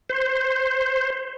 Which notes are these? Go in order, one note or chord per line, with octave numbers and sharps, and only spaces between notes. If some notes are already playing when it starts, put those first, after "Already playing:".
C5